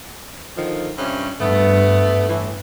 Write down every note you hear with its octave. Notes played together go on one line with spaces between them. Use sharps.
D3 D#3 F3
G2 C3 C#4
G2 A3 B3
A2 E3